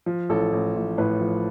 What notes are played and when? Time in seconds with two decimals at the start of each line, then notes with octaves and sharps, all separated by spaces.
0.06 F3
0.29 A1 A4
0.52 A1
0.76 A1
0.98 A2 B4
1.21 F3